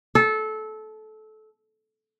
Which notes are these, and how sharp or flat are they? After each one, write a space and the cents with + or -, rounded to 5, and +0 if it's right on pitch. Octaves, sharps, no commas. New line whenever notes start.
A4 -20